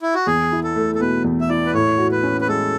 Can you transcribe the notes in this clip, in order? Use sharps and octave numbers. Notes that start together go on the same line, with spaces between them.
E4
F#4
E2 G#4
E4
A4
A3
A4
B2 B4
E2
E5
E4 D5
B4
A2 C#5
F#4
B4
C#4
B4
G#3 A4